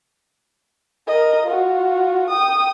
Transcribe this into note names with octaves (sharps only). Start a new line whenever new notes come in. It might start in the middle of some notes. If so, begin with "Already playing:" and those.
A#4 D#5
F4 F#4
G5 D#6